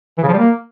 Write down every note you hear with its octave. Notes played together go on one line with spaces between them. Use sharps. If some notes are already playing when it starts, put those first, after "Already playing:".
E3
C#3
F3
G3
A#3